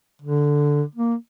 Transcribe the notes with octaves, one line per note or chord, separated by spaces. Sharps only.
D3
A#3